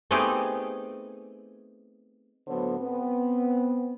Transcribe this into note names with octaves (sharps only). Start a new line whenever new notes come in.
A3 B3 C4 D#4 G4 G#4
A2 D3 F#3 B3 C5 C#5
B3 C4